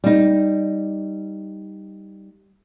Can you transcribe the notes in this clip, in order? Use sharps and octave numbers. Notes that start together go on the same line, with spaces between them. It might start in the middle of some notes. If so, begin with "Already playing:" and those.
G3 D#4